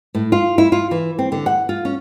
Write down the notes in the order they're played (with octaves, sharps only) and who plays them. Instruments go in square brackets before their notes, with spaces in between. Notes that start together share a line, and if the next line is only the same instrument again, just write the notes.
[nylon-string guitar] A2
F4
E4
F4
E3
C4
D3
F#5
F4
C#4